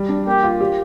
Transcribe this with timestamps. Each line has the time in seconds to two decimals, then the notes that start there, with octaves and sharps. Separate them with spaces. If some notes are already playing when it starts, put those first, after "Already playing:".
Already playing: G3
0.09 D4
0.27 A#3 G4
0.43 F4
0.61 G4